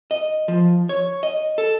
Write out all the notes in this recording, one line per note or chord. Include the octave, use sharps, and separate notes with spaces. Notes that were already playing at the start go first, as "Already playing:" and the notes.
D#5
F3
C#5
D#5
A4